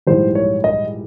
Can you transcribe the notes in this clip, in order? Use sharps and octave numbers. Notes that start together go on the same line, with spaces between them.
A#1 G#2 E3 G3 C5
C#5
D#5